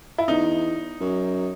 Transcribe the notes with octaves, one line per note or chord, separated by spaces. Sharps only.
E4
E2 D#4
F#2